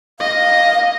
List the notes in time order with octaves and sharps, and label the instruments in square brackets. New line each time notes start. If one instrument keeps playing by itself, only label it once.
[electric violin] D#5 [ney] F5